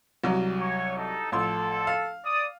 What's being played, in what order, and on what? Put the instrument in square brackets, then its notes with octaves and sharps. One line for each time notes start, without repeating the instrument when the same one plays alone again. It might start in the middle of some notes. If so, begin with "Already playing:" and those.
[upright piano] C2 F#3
[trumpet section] C#5
D#4 A4
[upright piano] A1 F3 C6 [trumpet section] A4
[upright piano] F5
[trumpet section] D5 D#6